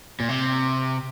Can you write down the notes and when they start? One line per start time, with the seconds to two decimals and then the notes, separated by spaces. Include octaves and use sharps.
0.20 A#2
0.29 C3